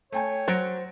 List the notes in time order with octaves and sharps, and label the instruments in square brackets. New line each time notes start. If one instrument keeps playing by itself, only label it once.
[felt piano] A3 G5 G#5 [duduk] C#5
[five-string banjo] F#3 [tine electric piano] C5 [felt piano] A6 A#6 D7